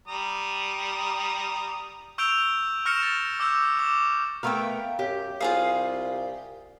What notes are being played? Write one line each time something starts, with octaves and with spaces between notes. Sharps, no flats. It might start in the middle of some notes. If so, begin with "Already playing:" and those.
G3 A#5 D#6
C#6 E6 G6 D7 F7 G7
C#6 F6 A#6 C#7 E7
A6
D6 E6 G6
D6 E7
A3 B3 A#4 F5 G5
F#2 G4
C2 F4 G#4 F5 D#6